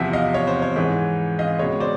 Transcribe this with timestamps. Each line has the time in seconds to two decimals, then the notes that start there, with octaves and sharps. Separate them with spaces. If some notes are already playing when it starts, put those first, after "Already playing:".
Already playing: E2 C3 F3 E5 F#5
0.13 D#5 F5
0.34 C#5
0.47 C5
0.62 C#5
0.76 G#2 E3 G#3
1.39 D#5 F5
1.59 C#2 B2 G#3 C#5
1.80 C5 D5